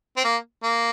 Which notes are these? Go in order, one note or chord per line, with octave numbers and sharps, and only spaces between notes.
C4
A#3
A#3